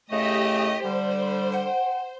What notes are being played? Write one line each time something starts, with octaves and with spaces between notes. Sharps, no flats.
A2 C#3 A3 G4 D#5
D3 G3 C5
F#5 G5